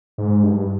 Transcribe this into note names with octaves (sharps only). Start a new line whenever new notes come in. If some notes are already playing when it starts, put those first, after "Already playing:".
G#2
G2